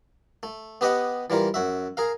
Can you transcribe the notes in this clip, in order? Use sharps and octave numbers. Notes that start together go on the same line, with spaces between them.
A3
B3 G4 B4 D#5 F#5
E3 G3 F4 A#4
F#2 F#4 E5
G#4 A#4 F5